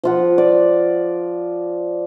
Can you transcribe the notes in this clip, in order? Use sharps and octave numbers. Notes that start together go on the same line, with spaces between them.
F3 F4 F#5
D5